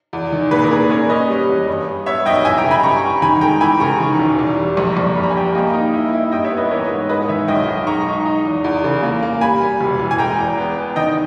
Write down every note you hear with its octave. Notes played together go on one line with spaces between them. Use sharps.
E2
D#3
A#2 G#4 B4
A#4
A#2 G#4 B4
C#4 A#4 C#5
C#4 B4 D#5
G3
E2
G2
G2
B3 C#5 E5
B1 D#5 G5
E3 E5 G#5
G5 A#5
C#3
G#5 B5
G2 A#5 C#6
G2
D#3 G#5 B5
G#3 G5 A#5
E3 G#5 B5
C#3 A#5 C#6
D#3
E1
E2
G3
A#1 A#5 C#6
A#1
G2 B5
A#5
G#5
G3 G5 A#5
A#3 D#5 G5
D#4
E4
E4
G2 D#5 G5
C#5 E5
B3
B4 D#5
E3 A#4 C#5
G#2
G#3 B4 D#5
D#3 C#5 E5
B1 D#5 G5
B1
G#3 A#5 C#6
D#4
D#4
E2
E2
C#3
A#3
A#3
G3 G#5 B5
G3
E1
E3
G#5
G#3 G5 A#5
E2
B3
B3
D#3 D#5 G5